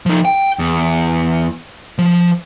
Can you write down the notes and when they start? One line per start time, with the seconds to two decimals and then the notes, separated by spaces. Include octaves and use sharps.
0.06 F3 D#4
0.25 G5
0.59 E2
1.99 F3